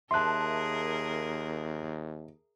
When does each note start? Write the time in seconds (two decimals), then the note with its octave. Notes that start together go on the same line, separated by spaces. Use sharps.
0.11 D#2 G#4 A#4 E5 A5 C6 F#6